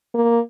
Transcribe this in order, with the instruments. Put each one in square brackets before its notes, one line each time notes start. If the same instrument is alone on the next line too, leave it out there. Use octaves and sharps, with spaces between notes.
[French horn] A#3